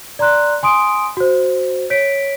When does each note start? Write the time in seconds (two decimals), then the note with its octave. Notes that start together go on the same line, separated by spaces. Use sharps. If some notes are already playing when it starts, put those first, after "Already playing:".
0.19 D5 A#5 C6 F#6
0.63 G#5 C6 D#6 D7
1.17 F#4 C5
1.90 C#5 B6 D7